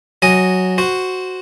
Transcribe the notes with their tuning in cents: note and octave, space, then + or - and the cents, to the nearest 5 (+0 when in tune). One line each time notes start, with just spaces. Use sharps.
F#3 +0 D#5 +0 G#5 +0
F#4 +0 C5 +0